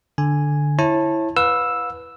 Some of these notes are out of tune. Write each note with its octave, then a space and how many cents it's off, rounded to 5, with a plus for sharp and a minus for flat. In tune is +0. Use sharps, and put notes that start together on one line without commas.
D3 +0 G#5 +0
E4 +0 C#5 -30 A5 +0
B4 +0 F5 +40 E6 +0